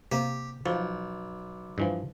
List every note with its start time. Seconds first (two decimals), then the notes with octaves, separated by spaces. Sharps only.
0.12 C3 A#3 G4
0.66 B1 F3
1.78 G2 E3 F3